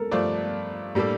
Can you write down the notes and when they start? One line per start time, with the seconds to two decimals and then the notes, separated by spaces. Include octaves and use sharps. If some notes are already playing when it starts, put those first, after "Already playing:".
Already playing: A4 A#4
0.11 G2 F3 A3 D4 F4 D5
0.95 A2 G3 A#3 D4 A4 D5